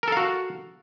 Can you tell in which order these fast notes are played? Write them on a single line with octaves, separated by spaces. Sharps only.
A#4 A4 F5 F#4